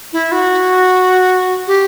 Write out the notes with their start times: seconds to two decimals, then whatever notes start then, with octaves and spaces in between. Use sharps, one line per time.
0.13 E4
0.32 F#4
1.67 G4